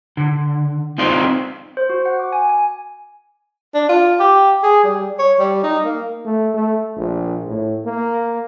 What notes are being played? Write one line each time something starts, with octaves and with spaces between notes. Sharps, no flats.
D3
C4 D#4 F4 C5 D5
C5
F#4
F#5
D6
G#5
G#5
D4
F4
G4
G#4
G3
C#5
G3
D#4
A#3
A3
A3
A#1
A2
A#3